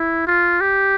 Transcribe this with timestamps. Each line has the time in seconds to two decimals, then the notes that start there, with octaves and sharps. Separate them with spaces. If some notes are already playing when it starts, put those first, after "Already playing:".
Already playing: E4
0.27 F4
0.61 G4